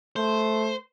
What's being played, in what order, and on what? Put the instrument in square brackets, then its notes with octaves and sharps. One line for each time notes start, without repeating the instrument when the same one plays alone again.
[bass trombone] A3 [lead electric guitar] C5